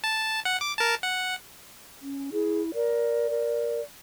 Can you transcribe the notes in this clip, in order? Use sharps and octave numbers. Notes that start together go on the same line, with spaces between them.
A5
F#5
D6
A#4 A5
F#5
C#4
E4 G#4
A#4 D5
A#4